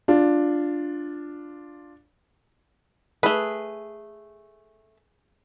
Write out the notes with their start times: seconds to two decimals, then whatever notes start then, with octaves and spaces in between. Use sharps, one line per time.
0.08 D4 F4
3.23 A3 G#4 B4